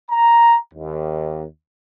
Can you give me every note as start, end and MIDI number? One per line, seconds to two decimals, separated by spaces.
0.10 0.56 82
0.74 1.43 39